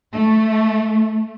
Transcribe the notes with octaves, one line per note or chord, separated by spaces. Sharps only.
A3